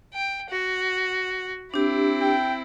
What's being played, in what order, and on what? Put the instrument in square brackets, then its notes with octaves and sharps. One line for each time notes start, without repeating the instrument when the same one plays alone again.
[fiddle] G5
F#4
[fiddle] C4 E4 [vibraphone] D4 G4
[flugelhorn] G5